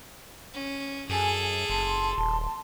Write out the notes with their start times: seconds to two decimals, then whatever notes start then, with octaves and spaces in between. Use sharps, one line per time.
0.54 C#4
1.09 F#2 G#4 A4 G#5
1.69 F#1 A5 C6
2.18 D#1